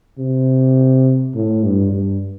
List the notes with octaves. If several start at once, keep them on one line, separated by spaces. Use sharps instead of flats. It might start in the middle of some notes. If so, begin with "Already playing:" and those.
C3
A2
G2
G2